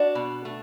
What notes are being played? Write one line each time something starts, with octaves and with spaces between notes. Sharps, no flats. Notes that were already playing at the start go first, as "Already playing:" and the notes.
Already playing: D4 F#4
B2
A3